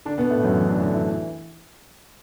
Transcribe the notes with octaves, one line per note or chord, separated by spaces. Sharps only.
D3 D4
B2 B3
A2 A3
F#2 F#3
E3 E4
D3 D4
D3 D4
E3 E4